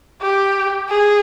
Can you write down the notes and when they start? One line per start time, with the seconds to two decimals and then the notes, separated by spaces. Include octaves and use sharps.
0.21 G4
0.89 G#4